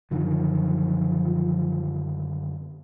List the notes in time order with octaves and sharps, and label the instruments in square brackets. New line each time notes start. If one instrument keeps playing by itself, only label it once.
[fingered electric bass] F#2 D3 D#3 [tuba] F3